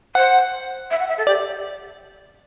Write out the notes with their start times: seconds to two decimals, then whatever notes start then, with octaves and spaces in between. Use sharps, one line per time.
0.15 C5 F#5
0.90 E5
0.99 F#5
1.08 E5
1.17 A4
1.27 G4 D5